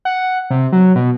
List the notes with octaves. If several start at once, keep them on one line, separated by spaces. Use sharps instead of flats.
F#5
C3
F#3
B2